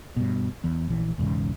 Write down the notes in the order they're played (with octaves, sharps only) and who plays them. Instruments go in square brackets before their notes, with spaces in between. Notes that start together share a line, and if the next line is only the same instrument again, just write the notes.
[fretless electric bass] G2 B2
E2
A#1 E3
B1 E2 G#2 C#3